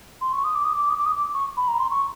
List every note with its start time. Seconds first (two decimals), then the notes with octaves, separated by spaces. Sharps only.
0.21 C6
0.33 C#6
0.44 D#6
0.55 D6
0.64 D#6
0.73 D6
0.90 D#6
0.97 D6
1.06 D#6
1.15 D6
1.34 C#6
1.57 B5
1.68 A#5
1.79 C6
1.90 C#6